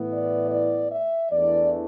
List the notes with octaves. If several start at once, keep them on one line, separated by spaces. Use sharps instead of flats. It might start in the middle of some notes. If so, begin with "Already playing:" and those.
Already playing: A2 E3 B3 E4
D5
D5
E5
E2 E3 A3 D4 D5